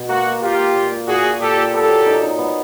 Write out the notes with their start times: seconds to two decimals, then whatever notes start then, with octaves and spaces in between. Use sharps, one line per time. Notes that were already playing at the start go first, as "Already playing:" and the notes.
Already playing: B2
0.08 A#3 F#4
0.25 A#3
0.42 A#3 F4 G4
0.58 A#3
0.74 A#2
0.91 A#2
1.07 A#2 F#4 G#4
1.24 A#2
1.40 A#2 G4 A4
1.57 A#2
1.74 B3 G4 A4
1.89 F#3
2.06 D#4
2.23 D#4
2.38 B3